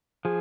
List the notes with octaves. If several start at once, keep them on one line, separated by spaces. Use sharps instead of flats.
F3 G#4